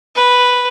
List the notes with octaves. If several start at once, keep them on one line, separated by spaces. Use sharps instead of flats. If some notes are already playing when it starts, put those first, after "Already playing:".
B4